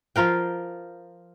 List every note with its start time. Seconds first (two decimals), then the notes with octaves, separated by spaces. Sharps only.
0.16 F3 F4 A#4 G5